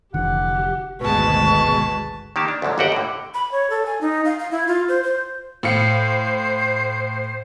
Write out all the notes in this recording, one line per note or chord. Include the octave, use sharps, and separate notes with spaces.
F1 D3 E3 F3 G4 F#5
G#1 D2 B2 G#3 B4 A5 C#6
D#3 A#3 G4 A5
D4
D2 G#2 D3 F3 F#3
G1 D#2 F#4 G4 F#5 G5
A2 D3
B5
C#5
A4
G#5
D#4
F5
F5
E4
F4
C5
C5
A2 C5 F5 C#7